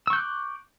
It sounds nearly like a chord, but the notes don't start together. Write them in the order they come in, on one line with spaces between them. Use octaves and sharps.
E6 C#6 G6 F#6 D6